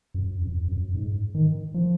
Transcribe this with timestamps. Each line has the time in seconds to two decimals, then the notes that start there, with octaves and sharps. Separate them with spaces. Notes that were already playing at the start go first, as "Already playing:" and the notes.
0.14 F#2
0.41 F2
0.68 F#2
0.95 G#2
1.35 D#3
1.74 F3